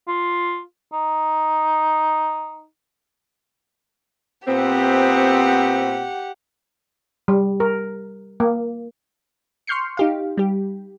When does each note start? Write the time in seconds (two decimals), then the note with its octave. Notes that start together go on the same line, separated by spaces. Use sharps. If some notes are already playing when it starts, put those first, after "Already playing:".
0.08 F4
0.93 D#4
4.47 A#2 B3 C4 G4 F#5
7.28 G3
7.60 A#4
8.40 A#3
9.67 C6 C#6 F6 G6 C7 C#7
9.97 D#4 G4 F5
10.37 G3 G4